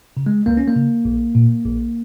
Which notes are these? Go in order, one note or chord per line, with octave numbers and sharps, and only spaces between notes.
C#3
G#3
C#2 A#3
C#4
A#3
C#3
A#1
A#2
A#1